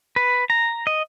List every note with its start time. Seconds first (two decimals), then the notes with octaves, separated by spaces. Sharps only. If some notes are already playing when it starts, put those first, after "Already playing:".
0.16 B4
0.50 A#5
0.87 D#5